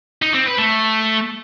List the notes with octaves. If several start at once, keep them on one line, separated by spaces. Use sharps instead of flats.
D#4
C4
B4
A3